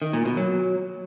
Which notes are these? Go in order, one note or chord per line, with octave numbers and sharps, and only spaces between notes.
D#3
A#2
B2
F#3